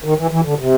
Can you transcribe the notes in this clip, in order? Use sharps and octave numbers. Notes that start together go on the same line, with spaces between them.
D#3
E3
E3
D3
C3